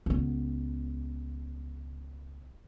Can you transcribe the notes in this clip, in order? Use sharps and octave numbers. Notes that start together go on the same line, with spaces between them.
C#2 B3